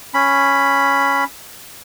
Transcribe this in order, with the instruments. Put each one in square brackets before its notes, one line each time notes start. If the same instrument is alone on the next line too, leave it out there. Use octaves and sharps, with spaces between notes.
[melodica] C#4 B5